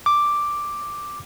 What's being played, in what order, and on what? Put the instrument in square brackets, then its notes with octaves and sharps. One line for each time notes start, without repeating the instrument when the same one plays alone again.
[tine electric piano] D6